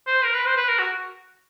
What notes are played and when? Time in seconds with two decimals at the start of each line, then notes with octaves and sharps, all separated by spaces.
0.07 C5
0.23 A#4
0.34 B4
0.46 C5
0.56 B4
0.68 A#4
0.79 F#4